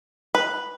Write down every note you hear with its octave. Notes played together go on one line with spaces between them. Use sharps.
B4